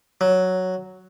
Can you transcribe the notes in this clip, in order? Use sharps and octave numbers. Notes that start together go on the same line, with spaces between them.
F#3